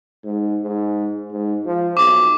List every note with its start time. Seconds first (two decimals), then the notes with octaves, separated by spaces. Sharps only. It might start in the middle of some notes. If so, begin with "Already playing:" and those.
0.24 G#2
0.62 G#2
1.32 G#2
1.65 F3
1.97 B1 D6